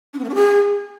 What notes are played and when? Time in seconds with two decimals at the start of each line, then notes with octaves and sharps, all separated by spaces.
0.13 D4
0.19 C4
0.24 A#3
0.29 D4
0.35 G#4